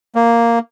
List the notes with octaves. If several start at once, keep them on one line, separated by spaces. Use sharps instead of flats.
A#3